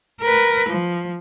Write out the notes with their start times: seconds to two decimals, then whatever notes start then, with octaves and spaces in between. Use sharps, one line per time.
0.21 A#4 B4
0.69 F3